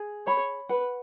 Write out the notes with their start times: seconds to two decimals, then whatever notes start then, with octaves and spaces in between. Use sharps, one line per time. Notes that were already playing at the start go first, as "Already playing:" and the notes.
Already playing: G#4
0.27 C#5 B5
0.69 B4 F#5